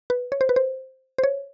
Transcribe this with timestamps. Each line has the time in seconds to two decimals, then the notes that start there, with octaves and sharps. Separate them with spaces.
0.10 B4
0.32 C#5
0.41 C5
0.49 B4
0.56 C5
1.18 C5
1.24 C#5